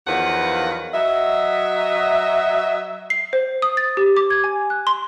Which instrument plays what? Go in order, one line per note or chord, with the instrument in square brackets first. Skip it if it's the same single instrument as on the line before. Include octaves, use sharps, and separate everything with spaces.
[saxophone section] E2 D#3 F3 F#3 B4 F#5
F#3 D#5 E5
[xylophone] C7
C5
D#6
A6
G4
D6
G#6
G#5
F#6
C6